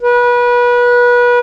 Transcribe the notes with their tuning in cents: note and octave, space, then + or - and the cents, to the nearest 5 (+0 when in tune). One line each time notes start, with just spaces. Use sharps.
B4 -25